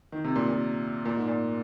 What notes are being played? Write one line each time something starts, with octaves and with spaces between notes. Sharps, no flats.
D#3
C3
A#2
A#2
A#2
G#2
A#2